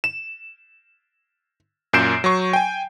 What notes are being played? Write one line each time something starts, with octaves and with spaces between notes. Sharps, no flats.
E7
F#2 A#2 G6 C7 D7 E7
F#3 C#6
G5 G#5